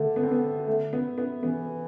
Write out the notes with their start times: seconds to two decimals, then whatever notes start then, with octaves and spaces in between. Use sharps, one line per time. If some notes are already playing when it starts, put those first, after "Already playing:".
Already playing: D3 A3
0.16 B3
0.23 C4
0.31 B3
0.67 A3
0.93 B3
1.18 B3
1.43 E3 B3